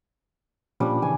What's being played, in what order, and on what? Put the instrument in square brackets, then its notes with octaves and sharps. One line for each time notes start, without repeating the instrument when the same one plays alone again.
[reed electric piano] A#2 F3 C#4 [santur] G3 D4
[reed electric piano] C#3 E3 [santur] G#5